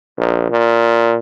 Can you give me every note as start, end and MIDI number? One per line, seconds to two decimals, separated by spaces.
0.18 0.48 34
0.51 1.17 46